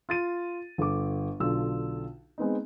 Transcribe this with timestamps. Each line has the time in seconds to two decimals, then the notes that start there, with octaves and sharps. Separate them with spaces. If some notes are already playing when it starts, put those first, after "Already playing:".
0.09 F4 A6 D#7
0.78 G1 A4 D6
1.40 B1 D3 F4 E6
2.38 G#3 B3 C4 D#4